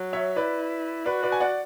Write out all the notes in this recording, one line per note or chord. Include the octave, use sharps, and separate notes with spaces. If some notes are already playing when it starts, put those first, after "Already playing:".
Already playing: F#3
C#5 E5
E4 B4 D5
F#4 B4 D5
B4 D5
G#5
D5 F#5